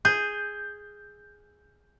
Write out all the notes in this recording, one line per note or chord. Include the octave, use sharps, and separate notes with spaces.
G#4 G6